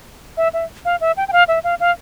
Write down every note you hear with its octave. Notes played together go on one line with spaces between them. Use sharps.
E5
E5
F5
E5
G5
G5
F5
E5
F5
F5